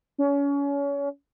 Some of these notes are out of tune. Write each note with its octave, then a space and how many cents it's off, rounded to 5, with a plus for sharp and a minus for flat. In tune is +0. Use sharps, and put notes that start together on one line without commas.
C#4 +30